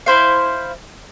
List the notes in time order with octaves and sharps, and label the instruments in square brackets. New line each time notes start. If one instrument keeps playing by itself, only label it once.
[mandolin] E4 C5 F5